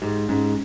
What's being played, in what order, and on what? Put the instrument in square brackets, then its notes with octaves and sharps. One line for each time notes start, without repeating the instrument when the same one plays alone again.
[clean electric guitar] G#2 [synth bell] G4
[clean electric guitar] G#2 [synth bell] C#4